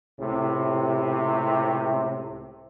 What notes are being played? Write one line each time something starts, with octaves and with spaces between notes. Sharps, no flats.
C#2 A2 C3